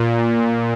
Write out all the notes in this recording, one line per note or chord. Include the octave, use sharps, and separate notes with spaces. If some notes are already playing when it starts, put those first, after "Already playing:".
Already playing: A#2